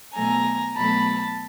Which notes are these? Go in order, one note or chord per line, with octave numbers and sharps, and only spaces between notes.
B2 F#3 A3 G#5 A#5
B2 F#3 A3 A5 B5